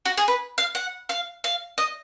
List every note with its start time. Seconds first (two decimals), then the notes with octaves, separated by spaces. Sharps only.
0.05 F#4
0.17 G#4
0.28 B4
0.58 F5
0.75 F#5
1.09 F5
1.44 F5
1.78 D#5